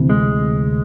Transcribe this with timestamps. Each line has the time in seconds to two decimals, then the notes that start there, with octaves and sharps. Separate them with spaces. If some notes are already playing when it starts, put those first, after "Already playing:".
Already playing: D2 C3 E3
0.09 G#3